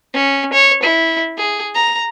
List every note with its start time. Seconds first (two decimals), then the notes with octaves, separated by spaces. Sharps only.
0.14 C#4
0.53 C#5
0.83 E4
1.38 G#4
1.74 A#5